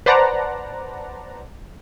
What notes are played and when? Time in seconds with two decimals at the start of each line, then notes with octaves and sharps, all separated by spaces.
0.06 B4 C5 D5 F#5 A5 A#5